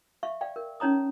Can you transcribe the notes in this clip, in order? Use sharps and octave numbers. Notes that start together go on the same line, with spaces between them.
E5 F5 C#6
D5 F5 G5
A#4
C#4 D#4 C#5 A#5 D#6